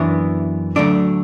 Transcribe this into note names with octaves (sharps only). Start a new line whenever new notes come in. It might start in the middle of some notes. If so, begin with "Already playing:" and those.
Already playing: F#2 E3 B3 D4 C#5
D2 C#3 F#3 A3 D4 D5